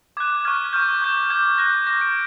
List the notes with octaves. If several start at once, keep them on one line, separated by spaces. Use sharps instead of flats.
D6 F#6 G#6
C#6 F6 G#6
C#6 F6 G6
D6 G6
D6 G6 G#6
D6 F#6 A#6
D6 F#6 A#6
D7